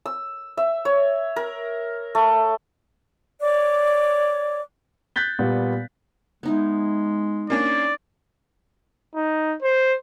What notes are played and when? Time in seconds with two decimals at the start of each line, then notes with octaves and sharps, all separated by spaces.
0.06 E6
0.57 E5
0.85 C#5
1.36 A#4
2.15 A3
3.41 C#5 D5 D6
5.16 F#6 G6 A6 B6 G7
5.39 A#2 G3 B3
6.43 G#3 B3 D#4 E4
7.50 A#3 C#4 D4 D5
9.15 D#4
9.62 C5